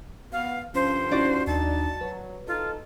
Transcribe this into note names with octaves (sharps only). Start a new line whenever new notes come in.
B3 F#4 F5
G2 D3 F3 C#4 C5
C#4 D#4 E4 F#4 D5
D#2 D4 D#4 A5
F#3 B4
D#4 F4 A4